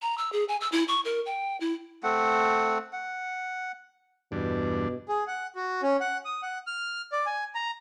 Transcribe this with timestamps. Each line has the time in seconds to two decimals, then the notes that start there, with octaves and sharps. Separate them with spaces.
0.02 A#5
0.18 E6
0.33 G#4
0.49 G#5
0.61 E6
0.72 E4
0.88 C#6
1.05 A#4
1.26 G5
1.60 E4
2.03 A3 C4 F#5
2.93 F#5
4.32 E2 G2 B2 D4
5.08 G#4
5.27 F#5
5.55 F#4
5.83 C#4
6.00 F#5
6.25 D#6
6.43 F#5
6.67 F6
7.12 D5
7.26 G#5
7.55 A#5